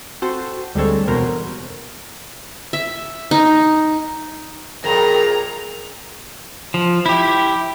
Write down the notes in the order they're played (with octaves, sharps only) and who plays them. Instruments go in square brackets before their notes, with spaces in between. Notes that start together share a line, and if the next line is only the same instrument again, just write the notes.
[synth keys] C4 F#4 A4 C5
D2 G3 G#3 C4 A4 C#5
E2 B2 A#4 C5
[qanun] E5
D#4
[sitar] F2 A#2 [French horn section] G#4 [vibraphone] A#4 G5 [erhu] A#5
[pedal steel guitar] F3
E4 G4